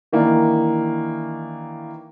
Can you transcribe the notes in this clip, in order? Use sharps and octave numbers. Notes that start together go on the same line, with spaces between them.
D#3 E3 A#3 D4